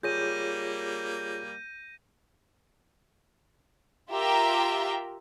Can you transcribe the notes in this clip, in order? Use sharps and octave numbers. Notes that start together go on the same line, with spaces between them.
G3 A#3 F4 G#4 C#5 G6 A#6 D#7
F4 G4 A#4 E5 G5 A#5